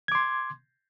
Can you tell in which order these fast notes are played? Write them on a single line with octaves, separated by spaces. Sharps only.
G#6 D6 C6